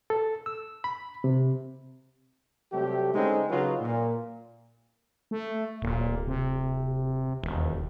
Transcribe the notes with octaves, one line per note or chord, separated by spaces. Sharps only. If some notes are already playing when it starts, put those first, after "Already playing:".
A4
E6
B5
C3
C3 F#3 G3 A3 G4
D3 G#3 A3 C4 C#4 D#4
C#3 F#3 D#4 F4 B4
A#2
A3
D1 A#2
C3
E1 D#2